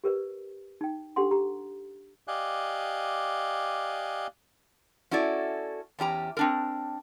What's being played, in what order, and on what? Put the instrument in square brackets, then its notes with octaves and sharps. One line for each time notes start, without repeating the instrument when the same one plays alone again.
[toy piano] G4 A#4 B4 D5
D#4 G5
D4 G4 A4 F#5 C6
G4 A#5
[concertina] G4 D5 D#5 F5 G#5 F#6
[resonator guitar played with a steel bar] C#4 E4 F#4 A4 D5
E2 C#4 G4 A#5
C4 D4 A#4